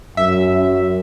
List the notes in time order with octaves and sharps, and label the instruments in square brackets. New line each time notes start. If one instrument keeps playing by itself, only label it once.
[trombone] F#2 [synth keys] E5